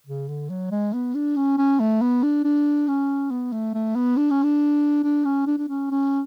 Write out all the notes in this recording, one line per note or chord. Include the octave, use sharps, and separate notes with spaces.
C#3
D3
F#3
G#3
B3
D4
C#4
C#4
A3
B3
D4
D4
C#4
B3
A3
A3
B3
D4
C#4
D4
D4
C#4
D4
D4
C#4
C#4